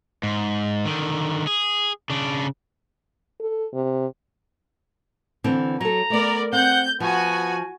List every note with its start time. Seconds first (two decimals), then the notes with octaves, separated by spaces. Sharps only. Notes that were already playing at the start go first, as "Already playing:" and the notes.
0.23 G#2
0.85 D3 D#3
1.47 G#4
2.10 C#3 D4
3.41 A4
3.73 C3
5.44 D3 E3 C4
5.81 F#3 A4 A#5
6.10 A3 B3 A#4 D5
6.53 C4 F#5 G6
7.00 F3 B3 F#4 G#5